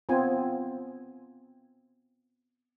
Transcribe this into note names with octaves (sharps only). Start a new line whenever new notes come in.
B3 C4 F4 G#5